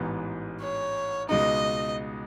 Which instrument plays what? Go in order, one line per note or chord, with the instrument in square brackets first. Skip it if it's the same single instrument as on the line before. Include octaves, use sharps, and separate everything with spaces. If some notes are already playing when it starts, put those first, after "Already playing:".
Already playing: [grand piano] A1 G#2 E3 B3
[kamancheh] C#5
[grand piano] C#2 B2 G#3 D#4 [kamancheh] D#5